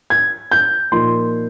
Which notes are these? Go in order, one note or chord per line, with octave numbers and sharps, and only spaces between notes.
G#6
G6
A#2 F3 A#3 D#4 C6